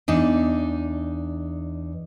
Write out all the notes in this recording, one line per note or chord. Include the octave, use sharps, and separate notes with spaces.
E2 D4 D#4